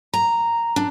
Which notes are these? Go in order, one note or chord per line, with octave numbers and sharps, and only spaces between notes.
A#5
D4